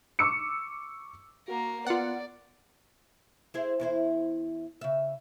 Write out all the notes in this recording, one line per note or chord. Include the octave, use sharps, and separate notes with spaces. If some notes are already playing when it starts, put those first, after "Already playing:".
C#6 D6 E6 C#7
A#3 F#4 A#4
B3 F4 D5 F#5
E4 G#4 C5
E2 E4 C5
C#3 E5